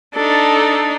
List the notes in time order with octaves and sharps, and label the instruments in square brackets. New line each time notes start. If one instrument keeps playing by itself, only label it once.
[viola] D4 D#4 [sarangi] A4